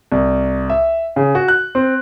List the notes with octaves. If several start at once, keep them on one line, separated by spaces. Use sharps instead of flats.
C2
E5
C#3
F#4
F#6
C4